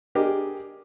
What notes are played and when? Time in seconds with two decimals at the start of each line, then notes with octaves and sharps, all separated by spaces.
0.15 D4 G4 G#4 A#4 D5 D#5